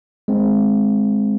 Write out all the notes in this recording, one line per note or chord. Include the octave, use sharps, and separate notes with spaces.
G#3 C4